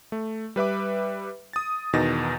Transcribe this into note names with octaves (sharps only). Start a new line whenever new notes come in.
A3
G3 B4 E5 D6
D#6 A6
E2 B2 D#3 D#4 A6 A#6